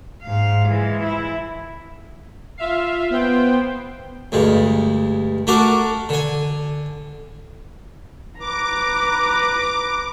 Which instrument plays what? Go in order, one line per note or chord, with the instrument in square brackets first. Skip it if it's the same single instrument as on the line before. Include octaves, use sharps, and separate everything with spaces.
[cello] G#2 F5
E3 G#3
E4
[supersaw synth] F4 E5 F5
B3 C5 G5
[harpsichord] D2 G2 G#3
A3 D4 F#4 A#4 D6
D3 G#5
[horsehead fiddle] B4 A#5 [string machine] D6